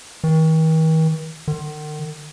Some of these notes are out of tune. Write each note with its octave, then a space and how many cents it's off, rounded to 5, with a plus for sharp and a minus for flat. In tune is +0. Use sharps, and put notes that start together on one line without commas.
D#3 +45
D#3 -45